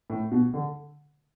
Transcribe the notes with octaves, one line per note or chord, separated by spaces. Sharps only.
A2
B2
D3